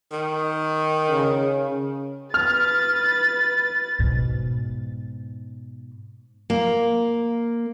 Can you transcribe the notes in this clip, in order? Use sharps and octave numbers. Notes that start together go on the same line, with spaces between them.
D#3
C#3
B4 F6 A6
G#2 B2
A#3